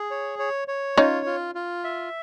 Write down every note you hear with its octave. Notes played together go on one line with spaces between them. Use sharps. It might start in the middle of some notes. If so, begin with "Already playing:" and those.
Already playing: G#4
C#5
C#5
C#5
C#4 D#4 F4
F4
F4
E5